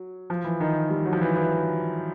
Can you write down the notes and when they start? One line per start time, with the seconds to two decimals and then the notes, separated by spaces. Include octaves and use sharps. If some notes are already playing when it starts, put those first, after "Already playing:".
Already playing: F#3
0.30 F3
0.44 E3
0.60 D#3
0.90 G3
1.06 F#3
1.13 F3
1.21 E3
1.36 E3